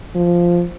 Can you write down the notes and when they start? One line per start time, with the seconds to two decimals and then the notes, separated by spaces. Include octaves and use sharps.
0.16 F3